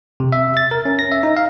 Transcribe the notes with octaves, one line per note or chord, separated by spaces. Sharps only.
C3
E5
A6
A#4
C#4
A#6
E5
D#4
F5